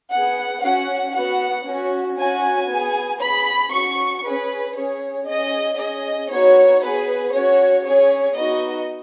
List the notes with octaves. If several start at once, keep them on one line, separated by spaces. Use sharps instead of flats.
B3 G#4 F#5
C#4 F#4 F#5
B3 F#4 F#5
C#4 F#4
C#4 F#4 G#5
B3 G#4
B3 G#4 B5
C#4 F#4 C#6
C#4 G#4 B4
C#4 G#4 C#5
C#4 G#4 D#5
C#4 G#4 D#5
B3 D#4 F#4 C#5
B3 G#4 B4
C#4 F#4 C#5
C#4 G#4 C#5
B3 D#4 F#4 D#5